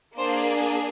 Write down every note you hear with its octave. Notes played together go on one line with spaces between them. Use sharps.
A#3 D4 G#4 C5